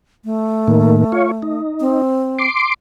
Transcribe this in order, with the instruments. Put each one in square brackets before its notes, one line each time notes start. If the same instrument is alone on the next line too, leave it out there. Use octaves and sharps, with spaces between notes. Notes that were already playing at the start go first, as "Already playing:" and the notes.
[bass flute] A3
[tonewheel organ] A2 D#3 A#3
F4 C#5
D#4
[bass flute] C4
[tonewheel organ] C6 D6